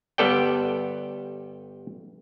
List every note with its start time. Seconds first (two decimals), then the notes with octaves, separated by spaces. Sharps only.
0.18 G1 G3 B3 A4 D5 G5